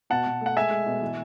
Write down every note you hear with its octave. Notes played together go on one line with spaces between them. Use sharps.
B2 F#5 A5
B2
A3 F#5
G#3 E5 G#5
G#3
B2
E3